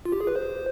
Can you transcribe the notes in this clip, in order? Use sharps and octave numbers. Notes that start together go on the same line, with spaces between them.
F4
G4
G#4
B4
C5